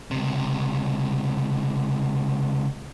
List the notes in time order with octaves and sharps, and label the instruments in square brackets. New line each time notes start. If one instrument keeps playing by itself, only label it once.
[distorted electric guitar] C#2 C3